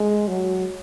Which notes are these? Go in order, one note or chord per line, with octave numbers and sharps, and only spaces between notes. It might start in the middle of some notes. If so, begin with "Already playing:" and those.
Already playing: G#3
F#3